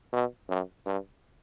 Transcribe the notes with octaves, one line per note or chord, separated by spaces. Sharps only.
B2
F#2
G2